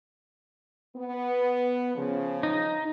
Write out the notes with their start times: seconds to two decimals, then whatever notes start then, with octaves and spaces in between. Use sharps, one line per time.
0.97 B3
1.96 C#3 F3
2.43 D#4